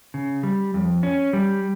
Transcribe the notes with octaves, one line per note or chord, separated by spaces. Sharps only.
C#3
G3
F2
C#4
G3